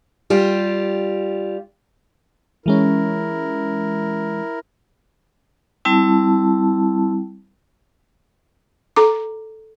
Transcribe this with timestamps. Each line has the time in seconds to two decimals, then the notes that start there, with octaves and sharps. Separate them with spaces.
0.30 G3 F4 G4
2.66 E3 G#3 C#4 E4 A#4
5.85 G3 C4 E4 A5
8.96 A4 A#5 D6